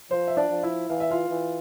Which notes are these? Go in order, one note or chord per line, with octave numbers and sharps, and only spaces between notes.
F3 C5
E5
D4 D5
F3
E4 E5
E3 F5
E5
F4 F5
E3